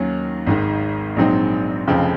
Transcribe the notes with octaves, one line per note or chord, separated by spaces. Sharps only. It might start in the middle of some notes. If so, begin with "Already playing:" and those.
Already playing: D#2 D#3 F#3 C#4
G#1 G#2 D#3
A#1 G#2 F#3 C4 D#4
F1 F2 C#3 F3 C4